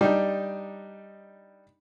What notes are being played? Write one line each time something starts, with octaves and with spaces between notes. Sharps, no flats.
G3 D4 D#4